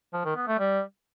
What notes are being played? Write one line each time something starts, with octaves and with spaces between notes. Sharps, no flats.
F3
D#3
B3
A3
G3